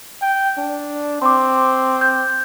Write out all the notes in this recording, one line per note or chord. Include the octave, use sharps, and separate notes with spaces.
G5
D4
C4 C6 D6
G6